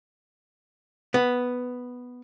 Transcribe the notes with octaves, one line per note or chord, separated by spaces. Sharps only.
B3